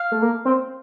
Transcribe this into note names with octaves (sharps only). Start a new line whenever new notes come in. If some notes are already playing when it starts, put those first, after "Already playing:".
Already playing: F5
A3
A#3
C4